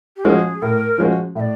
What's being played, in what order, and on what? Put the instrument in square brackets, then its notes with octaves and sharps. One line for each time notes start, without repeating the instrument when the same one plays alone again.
[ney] G4
[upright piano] F3 G#3 C#4 F#4 [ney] G#4 A#4
[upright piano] A2 [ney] A#4
[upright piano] F3 G#3 C#4 F#4
[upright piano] A2 [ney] E5
[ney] D5